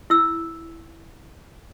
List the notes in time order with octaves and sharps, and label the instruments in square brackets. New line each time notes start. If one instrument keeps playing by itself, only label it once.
[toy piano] E4 E6